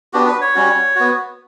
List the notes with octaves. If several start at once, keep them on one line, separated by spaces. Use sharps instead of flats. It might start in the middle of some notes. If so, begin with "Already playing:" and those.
B3 D4 F#4 G4
B4
C#5
G3 C#4 F#4
B3 F#4